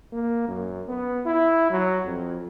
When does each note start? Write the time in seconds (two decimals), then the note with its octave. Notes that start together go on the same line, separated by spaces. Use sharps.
0.13 A#3
0.48 F#2
0.89 B3
1.26 E4
1.71 F#3
2.05 F2